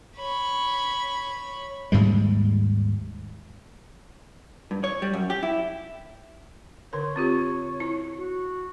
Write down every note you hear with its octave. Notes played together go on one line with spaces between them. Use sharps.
C#5 B5
D#2 G#2 G3 G#3
G2
C#5
G3
F#2
G4
E4
D3 A#4 C#5
C4 F4 G4
E4
F#4